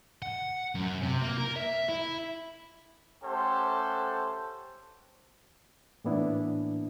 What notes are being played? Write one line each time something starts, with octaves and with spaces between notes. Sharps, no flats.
F#5
F#2
C3
A#3
A#4
E5
E4
A3 C#4 G4 A4 C5 F#5
A2 E3 A#3 B3 D4 E4